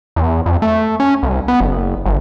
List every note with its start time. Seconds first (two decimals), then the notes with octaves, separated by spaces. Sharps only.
0.16 E2
0.46 F2
0.62 A3
1.00 C#4
1.23 C2
1.48 B3
1.60 F#1
2.06 G1